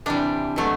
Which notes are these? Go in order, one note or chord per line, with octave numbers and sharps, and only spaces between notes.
C3 E3 G3 D4
B2 F#3 A3